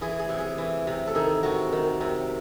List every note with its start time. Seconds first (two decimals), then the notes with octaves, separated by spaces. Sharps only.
0.01 E3 G#4
0.19 G#4
0.29 C3
0.38 G#4
0.58 E3
0.87 C3
1.07 A4
1.15 D#3 G#4
1.43 C3 F#4
1.72 D#3
2.00 C3